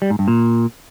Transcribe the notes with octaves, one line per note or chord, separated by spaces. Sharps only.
G3
G#2
G2
A#2